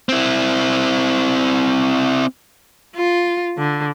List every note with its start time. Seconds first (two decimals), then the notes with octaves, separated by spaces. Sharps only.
0.09 C4 E4
2.96 F4
3.58 D3